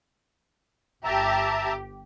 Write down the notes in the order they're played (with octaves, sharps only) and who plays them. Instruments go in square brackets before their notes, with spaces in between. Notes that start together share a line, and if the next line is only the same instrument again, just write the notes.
[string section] G1 G4 [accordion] E5 A5 A#5